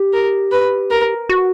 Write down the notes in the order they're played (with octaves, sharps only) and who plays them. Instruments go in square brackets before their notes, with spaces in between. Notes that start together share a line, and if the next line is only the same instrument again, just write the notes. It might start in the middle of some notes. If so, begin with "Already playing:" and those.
Already playing: [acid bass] G4
[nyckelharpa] A#4
B4
A#4
[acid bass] F#4